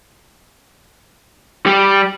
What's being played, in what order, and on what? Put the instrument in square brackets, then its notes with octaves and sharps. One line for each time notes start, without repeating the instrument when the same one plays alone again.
[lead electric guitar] G3